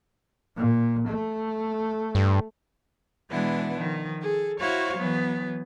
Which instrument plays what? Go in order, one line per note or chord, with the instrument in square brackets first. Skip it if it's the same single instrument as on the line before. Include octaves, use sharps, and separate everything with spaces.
[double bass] A#2
A3
[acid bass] G2
[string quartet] B2 E3 G#3 B3 D4 E4
D#3 F3
G#4 A4
E4 F#4 C5 C#5 F5
E3 F#3 B3